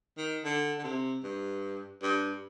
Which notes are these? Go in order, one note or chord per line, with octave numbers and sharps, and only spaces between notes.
D#3
D3
D3
C3
G2
G2